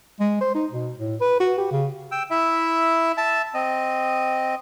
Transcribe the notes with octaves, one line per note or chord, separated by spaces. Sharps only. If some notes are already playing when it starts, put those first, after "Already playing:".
G#3
C5
D#4
B2
A2
B4
F#4
G4
C#3
G5 E6
E4 E5
E5 A5
C4 D#5